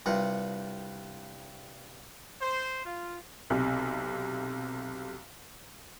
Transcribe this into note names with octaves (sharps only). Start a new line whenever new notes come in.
C2 G2 F4 F#5
C5
F4
B1 C3